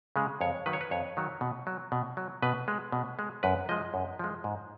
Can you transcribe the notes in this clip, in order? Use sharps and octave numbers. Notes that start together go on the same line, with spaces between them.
C#3 G#3
F2 C#5
D#3 F#3 B4
C#5
B4
F2 C#5
D#3 F#3
B2
F#3
B2
F#3
B2 B4
G#3
B2
G#3
F#2 B4
F3 G#3 D#5
F#2
F3 G#3
G#2